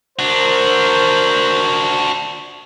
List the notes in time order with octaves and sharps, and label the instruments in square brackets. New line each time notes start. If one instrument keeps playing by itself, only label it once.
[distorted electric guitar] D4 F#4 [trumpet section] A#4 C5